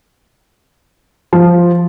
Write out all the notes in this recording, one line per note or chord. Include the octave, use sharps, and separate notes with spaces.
F3